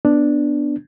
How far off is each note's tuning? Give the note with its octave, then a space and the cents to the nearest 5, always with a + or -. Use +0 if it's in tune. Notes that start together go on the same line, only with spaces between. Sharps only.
B3 +0 D4 +0